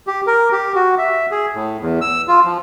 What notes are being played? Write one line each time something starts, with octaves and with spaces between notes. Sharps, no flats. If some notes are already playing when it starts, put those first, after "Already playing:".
G4
A#4
G4
F#4
E5
G#4
A2
E2
E6
F4
F3